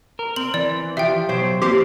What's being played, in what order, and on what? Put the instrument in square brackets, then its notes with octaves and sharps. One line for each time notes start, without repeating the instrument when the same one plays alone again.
[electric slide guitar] A#4
[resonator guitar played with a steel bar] C4 [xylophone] F#7
[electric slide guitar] E3 [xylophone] D5
[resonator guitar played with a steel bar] F3 G4 [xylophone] E5 G5
[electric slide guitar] B2 F#3 G4 [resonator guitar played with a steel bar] C5
[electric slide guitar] E3 F3 A#3 [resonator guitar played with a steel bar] C4 B4 C5 [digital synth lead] G4